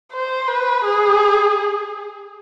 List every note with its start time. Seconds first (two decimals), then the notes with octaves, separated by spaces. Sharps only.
0.13 C5
0.48 B4
0.85 G#4